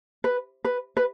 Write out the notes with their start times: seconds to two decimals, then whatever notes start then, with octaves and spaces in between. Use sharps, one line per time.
0.24 B4
0.64 B4
0.97 B4